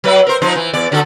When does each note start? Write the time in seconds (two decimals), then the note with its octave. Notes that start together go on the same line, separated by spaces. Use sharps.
0.04 F#3 B4 E5
0.27 A#4 C5
0.42 F3 D#4 C5
0.55 E3
0.73 E2 D5
0.92 D3 F#4 A4